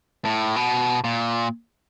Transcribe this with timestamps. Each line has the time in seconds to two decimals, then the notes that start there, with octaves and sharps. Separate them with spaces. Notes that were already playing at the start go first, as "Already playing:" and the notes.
0.25 A2
0.56 B2
1.04 A#2